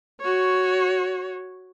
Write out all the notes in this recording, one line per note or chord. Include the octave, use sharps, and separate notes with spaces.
F#4 C#5